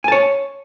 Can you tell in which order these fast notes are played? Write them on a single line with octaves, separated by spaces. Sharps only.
G#5 A5 C#5